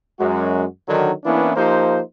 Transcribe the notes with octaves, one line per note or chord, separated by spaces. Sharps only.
F#2 G#3 F#4
D3 D#3 F#3
E3 A#3 B3 C#4 D4 E4
F3 A#3 D#4 G4 C5